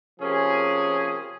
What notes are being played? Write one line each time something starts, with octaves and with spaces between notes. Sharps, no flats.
C3 F3 A#3 C#4 G#4